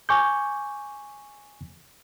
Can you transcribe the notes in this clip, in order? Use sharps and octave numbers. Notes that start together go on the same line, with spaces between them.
G#5 C#6 D6 G6